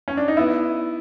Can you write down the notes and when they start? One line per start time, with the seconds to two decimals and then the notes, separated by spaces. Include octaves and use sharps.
0.08 C#4
0.17 D4
0.28 D#4
0.37 B3 E4